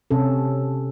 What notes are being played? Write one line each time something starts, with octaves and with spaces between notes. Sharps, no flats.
C3 C#4 A4